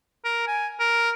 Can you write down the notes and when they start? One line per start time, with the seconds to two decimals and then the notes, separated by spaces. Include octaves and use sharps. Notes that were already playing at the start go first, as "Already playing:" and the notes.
0.25 A#4
0.47 G#5
0.80 A#4